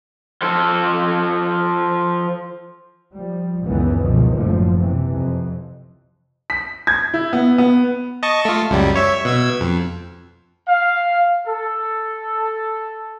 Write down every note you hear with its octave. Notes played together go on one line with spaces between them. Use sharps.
F3 A4
F3 G3
G#1 C#2 F#2 D#3 E3 B3
C#2 F#2 B2 D3 D#3 F3
F#1 F#2 A2 F3
C3 E3
F2
B6
G#6
E4
B3
B3
D#5 A5 C#6
A3 F4
C#2 F#2 G3
C#5 E5
B2 E6 G#6
F2
F5
A4